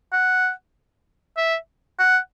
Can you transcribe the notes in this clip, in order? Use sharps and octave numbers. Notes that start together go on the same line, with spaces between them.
F#5
E5
F#5